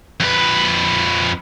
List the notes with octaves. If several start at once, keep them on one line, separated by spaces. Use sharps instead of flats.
F2 B4